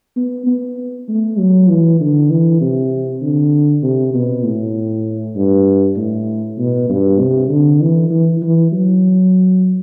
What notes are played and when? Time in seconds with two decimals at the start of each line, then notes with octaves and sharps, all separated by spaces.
0.17 B3
0.47 B3
1.08 A3
1.39 F#3
1.69 E3
2.01 D3
2.30 E3
2.61 C3
3.22 D3
3.83 C3
4.14 B2
4.44 A2
5.36 G2
5.97 A2
6.58 B2
6.89 G2
7.19 C3
7.50 D3
7.81 E3
8.10 E3
8.42 E3
8.72 F#3